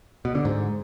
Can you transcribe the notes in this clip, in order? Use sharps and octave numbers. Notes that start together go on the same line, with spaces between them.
B2
D3
G#2